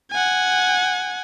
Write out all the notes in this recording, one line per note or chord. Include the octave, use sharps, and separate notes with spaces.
F#5 G#5